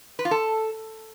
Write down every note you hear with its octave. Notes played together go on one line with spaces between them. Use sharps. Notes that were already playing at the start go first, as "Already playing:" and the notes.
B4
F4
A4